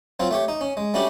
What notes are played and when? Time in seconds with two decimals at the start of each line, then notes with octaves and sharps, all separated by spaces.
0.20 F#3 C4 F4
0.31 A3 G4 C#5
0.48 D#4
0.61 C#4
0.77 G#3
0.94 G3 A3 C#4 D4 F#4 G4